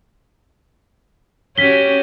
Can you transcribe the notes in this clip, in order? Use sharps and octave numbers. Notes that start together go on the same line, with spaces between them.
C#4 F#4 G4 B6 G7